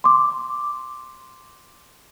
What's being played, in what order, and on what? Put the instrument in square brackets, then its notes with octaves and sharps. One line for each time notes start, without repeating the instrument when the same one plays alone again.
[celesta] C6 D6